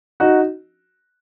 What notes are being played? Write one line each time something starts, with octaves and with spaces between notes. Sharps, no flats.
D#4 F#4